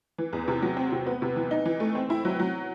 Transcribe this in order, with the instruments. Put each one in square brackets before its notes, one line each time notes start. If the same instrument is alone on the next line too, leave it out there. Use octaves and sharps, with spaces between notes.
[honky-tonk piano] E3
E2
C3
F#3
C4
C3
B3
C3
E3
D#4
E3
A3
C4
E4
F#3
F#3